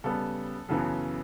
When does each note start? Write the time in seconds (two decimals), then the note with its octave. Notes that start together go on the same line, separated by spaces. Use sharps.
0.04 C#3 G3 B3 A4
0.69 F#2 C#3 E3 B3 A4